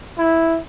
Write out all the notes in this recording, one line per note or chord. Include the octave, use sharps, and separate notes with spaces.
E4